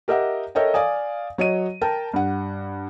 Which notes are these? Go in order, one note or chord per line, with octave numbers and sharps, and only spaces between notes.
G4 A#4 D#5 E5 F#5
A4 A#4 C#5 D#5 E5 G5
D5 F5 G#5 D#6
F#3 C#5 D#5 D#7
A#4 G5 A5
G2 F#5